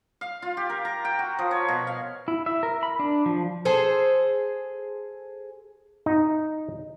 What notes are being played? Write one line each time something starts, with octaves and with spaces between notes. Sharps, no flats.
F5
F4
G4
A#4
A#5
G5
F#4
F3
C#5
B2
F5
E4
E5
A#4
B5
D4
F3
G#4 A4 C5
D#4